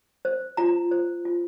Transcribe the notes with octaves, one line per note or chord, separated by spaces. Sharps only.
C5
F4 A#5
C5
F4